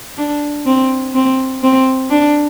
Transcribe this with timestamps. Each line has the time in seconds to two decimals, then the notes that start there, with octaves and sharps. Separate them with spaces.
0.18 D4
0.66 C4
1.15 C4
1.63 C4
2.10 D4